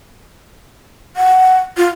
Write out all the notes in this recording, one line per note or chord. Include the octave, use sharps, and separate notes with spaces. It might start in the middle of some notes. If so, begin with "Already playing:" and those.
F#5
F4